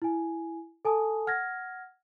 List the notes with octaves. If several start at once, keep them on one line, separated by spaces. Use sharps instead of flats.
E4 G#5
A4 G#5 A5 D#6
F#5 F6 G#6 A#6